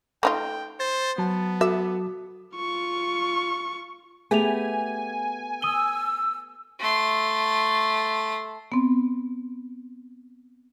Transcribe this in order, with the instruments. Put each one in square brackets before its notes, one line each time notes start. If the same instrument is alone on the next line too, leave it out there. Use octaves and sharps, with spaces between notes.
[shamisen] A3 D#4 F4 [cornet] G5
[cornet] C5 [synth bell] A6
[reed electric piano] F#3 A5 [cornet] B3
[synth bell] F#4 [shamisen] E5
[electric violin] F4 C#6
[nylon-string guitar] A3 B3 G4 [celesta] G#4 F7 [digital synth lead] G#5
[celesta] D#6 D#7 G7 [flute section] E6
[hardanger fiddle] A3 C6
[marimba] B3 C4